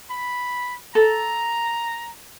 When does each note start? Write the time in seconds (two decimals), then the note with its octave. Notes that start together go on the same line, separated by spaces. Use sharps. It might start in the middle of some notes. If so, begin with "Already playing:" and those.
0.10 B5
0.95 A4 A#5